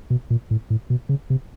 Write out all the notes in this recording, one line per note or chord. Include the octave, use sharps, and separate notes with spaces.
B2
A#2
A2
A2
B2
C#3
C3